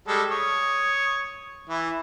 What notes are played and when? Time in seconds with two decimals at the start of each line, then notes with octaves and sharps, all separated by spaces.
0.08 G3 G#3 A4
0.31 C#5 D#6
1.69 E3 E4